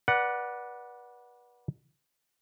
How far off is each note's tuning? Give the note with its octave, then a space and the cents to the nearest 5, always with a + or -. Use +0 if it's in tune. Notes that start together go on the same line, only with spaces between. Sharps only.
B4 -30 D5 +0 F#5 +0